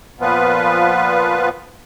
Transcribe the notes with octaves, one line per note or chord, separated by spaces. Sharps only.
A#2 F3 B3 F4 B4